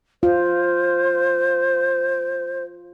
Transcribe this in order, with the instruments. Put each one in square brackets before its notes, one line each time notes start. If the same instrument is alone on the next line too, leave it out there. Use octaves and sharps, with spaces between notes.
[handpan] F4 [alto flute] C5